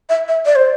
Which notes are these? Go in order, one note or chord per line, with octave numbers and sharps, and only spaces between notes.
E5
E5
D5
C5